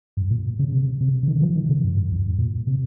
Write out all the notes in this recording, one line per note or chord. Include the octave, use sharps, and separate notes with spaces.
G2
A#2
C#3
C3
C3
C#3
D#3
F3
D#3
C3
G2
G2
F2
G2
A#2
C3